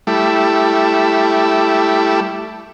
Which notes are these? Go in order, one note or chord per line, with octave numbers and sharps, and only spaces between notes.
G3 A3 E4